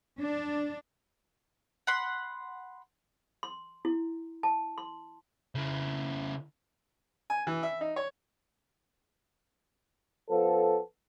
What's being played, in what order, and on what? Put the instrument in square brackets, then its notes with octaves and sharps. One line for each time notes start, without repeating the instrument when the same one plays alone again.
[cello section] D4
[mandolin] F#5 B5 C6
[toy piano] C6
E4
A5
C6
[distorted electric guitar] C#3 E4
[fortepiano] G#5
E3
E5
D#4
C#5
[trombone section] F3 B3 A4